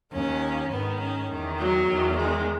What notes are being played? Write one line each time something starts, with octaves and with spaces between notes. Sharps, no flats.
D#2 D#3 C#4
G#2 D#3 B3
C#4
E2 D#3
F#3
E2 D#3
G#3